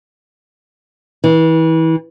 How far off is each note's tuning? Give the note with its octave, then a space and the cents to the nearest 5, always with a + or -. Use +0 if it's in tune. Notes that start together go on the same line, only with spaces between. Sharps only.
E3 -30